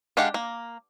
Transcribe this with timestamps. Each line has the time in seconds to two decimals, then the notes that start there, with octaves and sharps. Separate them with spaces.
0.17 G#3 D4 G4 F5 F#5
0.34 A#3